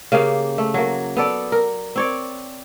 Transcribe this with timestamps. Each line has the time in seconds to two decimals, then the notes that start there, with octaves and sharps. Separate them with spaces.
0.12 C#3 A#3 G4 F5
0.58 A3
0.74 F#3 A#3
1.17 B3 A4 D5
1.52 A#4
1.96 C4 C#5 D5